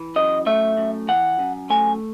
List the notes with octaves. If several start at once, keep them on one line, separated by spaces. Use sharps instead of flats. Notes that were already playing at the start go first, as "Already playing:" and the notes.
Already playing: E3
F#2 D#5
A3 E5
F#2
E3 F#5
F#2
A3 G#5